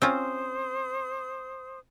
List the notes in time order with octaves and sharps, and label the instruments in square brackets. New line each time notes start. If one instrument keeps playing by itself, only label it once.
[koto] C4 C#4 F4 [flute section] C5 D#6